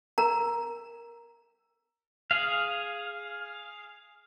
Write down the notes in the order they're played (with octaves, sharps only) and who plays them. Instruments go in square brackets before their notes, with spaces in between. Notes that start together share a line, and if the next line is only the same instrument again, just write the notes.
[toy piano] A#4 A#5
[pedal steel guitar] G#4 F5